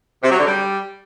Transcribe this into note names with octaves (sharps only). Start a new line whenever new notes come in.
C3
F#3
D3
G3